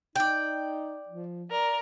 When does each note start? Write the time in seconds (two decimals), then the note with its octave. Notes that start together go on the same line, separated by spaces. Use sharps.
0.16 D#4 D5 G5
1.08 F3
1.51 A#4 D5